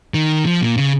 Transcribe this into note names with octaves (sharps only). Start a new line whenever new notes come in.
D#3
F3
A#2
C#3